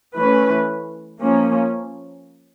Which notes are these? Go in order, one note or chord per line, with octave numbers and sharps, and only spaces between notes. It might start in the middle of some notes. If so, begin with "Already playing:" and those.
E3 A3 C#4 B4
F3 A#3 C#4